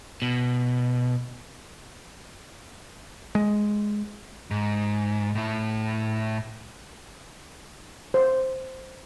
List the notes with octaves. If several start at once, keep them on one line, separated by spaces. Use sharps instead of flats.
B2
G#3
G#2
A2 E4
C5